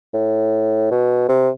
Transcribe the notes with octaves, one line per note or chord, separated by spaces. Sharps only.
A2
B2
C3